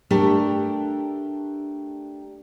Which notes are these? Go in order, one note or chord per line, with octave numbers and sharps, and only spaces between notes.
A3 D4 G4 A#4